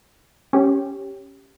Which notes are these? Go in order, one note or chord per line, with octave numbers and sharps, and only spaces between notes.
C#4 G4